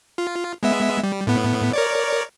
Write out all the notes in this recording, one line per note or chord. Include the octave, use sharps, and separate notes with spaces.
F4
G#3 B3 E5
G3
A2 B3
A#4 C#5 D5